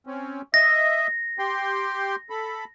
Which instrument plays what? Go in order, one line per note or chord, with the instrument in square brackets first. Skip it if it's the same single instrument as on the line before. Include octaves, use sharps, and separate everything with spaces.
[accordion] C4 C#4
[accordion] D#5 E5 [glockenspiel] A#6
[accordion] G4 G5 C6
A4 B5